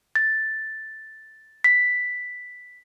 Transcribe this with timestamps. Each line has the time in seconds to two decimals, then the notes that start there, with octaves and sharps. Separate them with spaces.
0.15 A6
1.64 B6